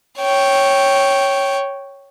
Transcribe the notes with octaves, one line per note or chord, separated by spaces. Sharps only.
C#5 G5